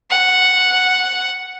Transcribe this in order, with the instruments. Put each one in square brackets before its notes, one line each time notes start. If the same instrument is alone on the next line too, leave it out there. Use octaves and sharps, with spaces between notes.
[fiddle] F#5